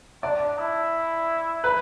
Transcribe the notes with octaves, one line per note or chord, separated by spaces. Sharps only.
D4 D5
E4
B4